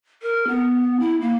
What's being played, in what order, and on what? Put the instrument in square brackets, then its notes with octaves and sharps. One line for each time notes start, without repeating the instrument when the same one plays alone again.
[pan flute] A#4
B3
E4
A#3